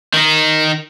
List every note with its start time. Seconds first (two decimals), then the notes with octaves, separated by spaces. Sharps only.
0.14 D#3 D#4